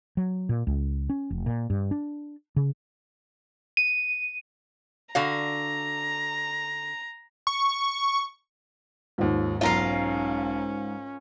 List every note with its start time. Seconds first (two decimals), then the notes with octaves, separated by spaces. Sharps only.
0.17 F#3
0.49 A#2
0.67 C#2
1.10 C#4
1.30 F1
1.46 A#2
1.70 G2
1.91 D4
2.56 C#3
3.77 D#7
5.15 D3 F#4 F5 A#5
7.47 C#6
9.18 D#2 G#2 F3
9.61 B1 C#4 F4 A#4 F5